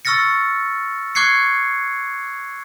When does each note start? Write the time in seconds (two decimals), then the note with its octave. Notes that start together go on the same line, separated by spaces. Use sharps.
0.05 C#6 E6 F6 A6 A#6 C#7
1.15 C#6 D6 F#6 G#6 C7 C#7